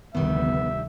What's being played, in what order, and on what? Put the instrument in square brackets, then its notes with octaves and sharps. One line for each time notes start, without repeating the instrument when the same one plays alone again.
[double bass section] F1 D2 D3 [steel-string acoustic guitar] D#3 G3 [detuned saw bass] B3 [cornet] E5